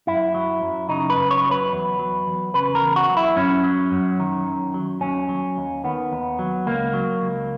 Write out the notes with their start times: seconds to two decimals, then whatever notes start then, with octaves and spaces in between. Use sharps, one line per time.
0.07 F#2 E4
0.34 F#3
0.62 F#2
0.89 C#3 D#4
1.10 B4
1.17 F#2
1.31 C#5
1.45 F#3
1.51 B4
1.72 E2
1.99 F#3
2.26 E2
2.54 C#3 B4
2.75 A#4
2.82 E2
2.96 F#4
3.09 F#3
3.17 E4
3.36 F#2 C#4
3.64 F#3
3.92 F#2
4.20 D#3
4.47 F#2
4.74 F#3
5.01 D#2 C#4
5.29 F#3
5.57 D#2
5.84 D#3 B3
6.12 D#2
6.39 F#3
6.67 C#2 A#3
6.94 F#3
7.22 C#2